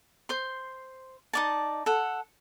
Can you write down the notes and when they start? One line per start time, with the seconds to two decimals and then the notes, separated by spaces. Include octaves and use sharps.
0.29 C5 C6
1.33 D#4 D5 A5
1.86 A4 F#5